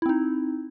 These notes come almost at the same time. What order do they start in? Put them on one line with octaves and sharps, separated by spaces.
E4 C4 D#4